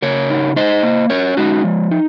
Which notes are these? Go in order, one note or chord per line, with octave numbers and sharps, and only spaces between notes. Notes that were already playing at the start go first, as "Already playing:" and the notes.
C#3 A#4 C#5
D#4
D#4 C5 D#5
A#3
C#4 A#4 C#5
G#3 D#4 F#4
F3
D#4